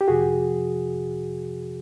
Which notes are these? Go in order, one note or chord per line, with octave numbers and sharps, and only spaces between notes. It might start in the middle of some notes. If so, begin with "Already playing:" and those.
G4
F2 C3 F3 F#4 G#4